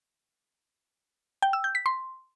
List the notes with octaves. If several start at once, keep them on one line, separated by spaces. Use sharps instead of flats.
G5
E6
G6
B6
C6